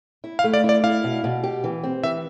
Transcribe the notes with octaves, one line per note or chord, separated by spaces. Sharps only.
E4
F5
A3
D5
E4
D5
E4 F5
B2
B2
G4
E3
C4
E3 E5